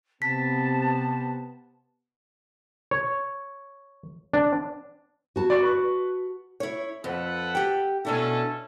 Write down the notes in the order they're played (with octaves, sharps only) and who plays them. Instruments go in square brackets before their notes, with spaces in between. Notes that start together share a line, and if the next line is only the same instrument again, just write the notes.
[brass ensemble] C3 B3 [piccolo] A5 [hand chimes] B6
[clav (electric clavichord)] C#5
D4
[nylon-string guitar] F#4 A5
[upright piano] D5 C#6
B4 C#6
[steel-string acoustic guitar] E4 C#5
[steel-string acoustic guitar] F2 [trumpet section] A4 B4 F#5
[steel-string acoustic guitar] G4 G5
[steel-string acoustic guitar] B2 D4 E4 [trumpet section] C#4 A4